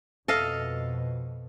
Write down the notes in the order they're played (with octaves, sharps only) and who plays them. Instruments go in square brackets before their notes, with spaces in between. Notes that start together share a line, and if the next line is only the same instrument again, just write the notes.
[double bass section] F2 B2 [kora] A4 D#5 F5